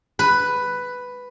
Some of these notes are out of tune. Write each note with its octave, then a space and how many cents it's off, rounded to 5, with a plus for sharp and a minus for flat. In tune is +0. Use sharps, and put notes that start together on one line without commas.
B4 +5